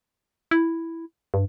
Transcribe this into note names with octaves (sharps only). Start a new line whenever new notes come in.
E4
G2